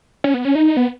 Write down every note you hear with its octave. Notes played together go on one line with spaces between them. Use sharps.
C#4
B3
C#4
D#4
B3